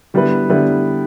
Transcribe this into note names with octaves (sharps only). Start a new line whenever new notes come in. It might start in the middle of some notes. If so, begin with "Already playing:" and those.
D3 G3 B3 E4 B4
D3 G3 B3 E4 B4